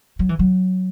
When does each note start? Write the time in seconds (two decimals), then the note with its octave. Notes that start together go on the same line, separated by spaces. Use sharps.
0.19 F#3
0.29 E3
0.39 F#3